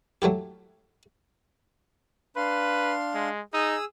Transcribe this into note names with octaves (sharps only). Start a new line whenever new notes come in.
F#3 A3 E4 G4
D4 B4 F5 C6
G#3
D#4 G#4 D#6 E6